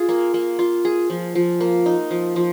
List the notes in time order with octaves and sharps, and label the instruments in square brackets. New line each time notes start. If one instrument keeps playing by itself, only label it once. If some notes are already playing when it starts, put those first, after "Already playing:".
Already playing: [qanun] F4 G#4
A#3
A#3
F4
G#4
F3
F3
A#3
D#4
F3
F3